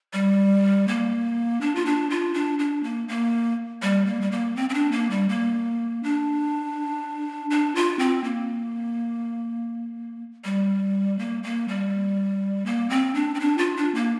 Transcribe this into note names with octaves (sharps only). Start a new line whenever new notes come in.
G3
A#3
D4
F4
D4
F4
D4
D4
A#3
A#3
G3
A#3
G3
A#3
C4
C4
D4
A#3
G3
A#3
D4
D4
F4
C4
A#3
G3
A#3
A#3
G3
A#3
C4
D4
C4
D4
F4
D4
A#3